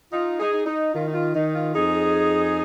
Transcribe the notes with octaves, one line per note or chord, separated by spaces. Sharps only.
D#4 F4
D#4 G#4
D#4
D#4
D#3 F4
D#4
F4
D#3 D#4
F4
F2 D#4 G#4